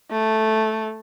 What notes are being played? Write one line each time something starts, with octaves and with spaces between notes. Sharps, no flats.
A3